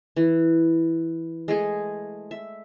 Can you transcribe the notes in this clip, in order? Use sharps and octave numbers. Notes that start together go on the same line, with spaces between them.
E3
G#3 A3 G#4
E5